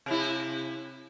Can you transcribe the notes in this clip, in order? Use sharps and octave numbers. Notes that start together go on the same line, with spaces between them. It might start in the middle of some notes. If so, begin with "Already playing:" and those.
C3 E4